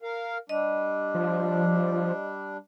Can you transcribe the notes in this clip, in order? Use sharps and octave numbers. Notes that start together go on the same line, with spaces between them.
A#4 F5
G3 D4 D#5
F3